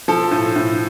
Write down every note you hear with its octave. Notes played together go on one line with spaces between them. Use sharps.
F3 A4
A2
A2